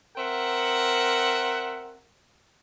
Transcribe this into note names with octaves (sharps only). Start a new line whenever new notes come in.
C4 A#4 E5 F#5